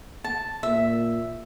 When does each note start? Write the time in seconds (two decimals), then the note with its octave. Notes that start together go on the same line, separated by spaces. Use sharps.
0.24 A5
0.63 A#2 E5